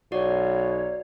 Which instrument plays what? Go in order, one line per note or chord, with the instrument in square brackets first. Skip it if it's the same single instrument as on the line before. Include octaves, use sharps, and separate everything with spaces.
[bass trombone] B1 [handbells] F#4 D5 [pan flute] C#5